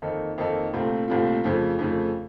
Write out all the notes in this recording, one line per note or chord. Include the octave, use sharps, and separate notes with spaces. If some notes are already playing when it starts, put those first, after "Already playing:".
F2 D#3 A#3 D#4 A4
F2 D#3 A#3 D#4 A4
C2 A#2 A3 C4 F4
C2 A#2 A3 C4 F4
F2 C#3 F3 A3
F2 C#3 F3 A3